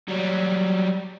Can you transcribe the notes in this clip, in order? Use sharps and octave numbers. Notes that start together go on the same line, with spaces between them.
F#3 G3